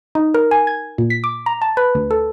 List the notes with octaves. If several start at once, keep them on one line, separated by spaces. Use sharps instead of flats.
D#4
A#4
G#5
G#6
A#2
B6
D6
A#5
A5
B4
D2
A4